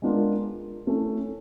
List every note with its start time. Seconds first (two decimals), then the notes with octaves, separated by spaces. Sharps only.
0.02 G#3 B3 D4 F4 A#4
0.87 A3 C#4 E4